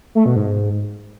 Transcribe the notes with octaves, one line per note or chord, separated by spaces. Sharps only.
A3
B2
G#2